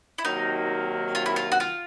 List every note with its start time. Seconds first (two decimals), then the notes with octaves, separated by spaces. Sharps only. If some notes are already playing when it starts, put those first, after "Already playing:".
0.18 E4
0.25 C3 D#3 F#3 A#3 D#4
1.15 F4
1.26 E4
1.36 F4
1.52 F#4
1.60 F4